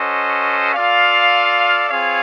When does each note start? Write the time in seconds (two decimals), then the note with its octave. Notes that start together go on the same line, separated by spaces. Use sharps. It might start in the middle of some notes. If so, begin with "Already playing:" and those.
Already playing: C#4 F#4 A4 C5 D#5
0.75 F4 A4 D5 F5
1.90 C4 F4 G#4 C#5 F5